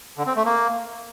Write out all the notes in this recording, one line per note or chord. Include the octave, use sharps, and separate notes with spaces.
D3
C4
A3
A#3